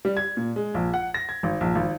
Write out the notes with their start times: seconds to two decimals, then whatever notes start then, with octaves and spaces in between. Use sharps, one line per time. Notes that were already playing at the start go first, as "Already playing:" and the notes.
0.05 G3
0.17 G#6
0.37 A#2
0.56 G#3
0.74 A#1
0.94 F#5
1.14 A#6
1.29 G#6
1.43 G#1
1.61 A#1
1.75 G#1